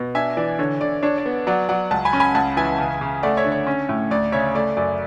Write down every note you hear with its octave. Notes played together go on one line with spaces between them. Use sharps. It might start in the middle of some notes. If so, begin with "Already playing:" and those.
Already playing: B2
D4 E5 G#5
E3 D5
D3 C#5
D3 D5
D4 C#5
D5
B3
F#3 D5 F#5
F#3 D5 F#5
C#2 F#5 A5
G#5 B5
C#4
G#5 B5
C#2 F#5 A5
E3 E5 G#5
C#3
C#3
A3 D5 F#5
C#5 E5
D3
C#5
C#4
A2
D2 D5
C#3 C#5 E5
A3 D5
F#2 D5